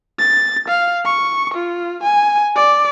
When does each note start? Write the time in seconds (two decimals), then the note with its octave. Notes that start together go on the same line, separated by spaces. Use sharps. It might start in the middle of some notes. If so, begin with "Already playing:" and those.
0.19 A6
0.68 F5
1.05 C#6
1.54 F4
2.03 G#5
2.56 D5